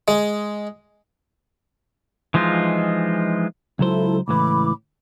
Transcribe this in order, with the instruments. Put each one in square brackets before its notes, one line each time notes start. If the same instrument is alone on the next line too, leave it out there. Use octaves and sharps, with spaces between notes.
[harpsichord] G#3
[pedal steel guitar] E3 F3 G#3 D#4 F4
[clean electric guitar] C#2 F#3 C5 [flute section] E4 F4 A4
[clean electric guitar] C#2 A2 E3 [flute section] B5 D6